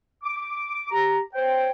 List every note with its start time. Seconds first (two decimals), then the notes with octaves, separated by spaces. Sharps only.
0.23 D6
0.91 G4 A#5
1.34 C5 C#5 G5